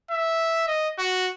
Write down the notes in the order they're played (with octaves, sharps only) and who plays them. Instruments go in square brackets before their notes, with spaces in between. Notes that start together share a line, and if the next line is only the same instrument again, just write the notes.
[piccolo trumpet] E5
D#5
F#4